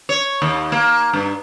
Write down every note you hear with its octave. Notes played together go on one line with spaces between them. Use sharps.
C#5
D#2
A#3
G2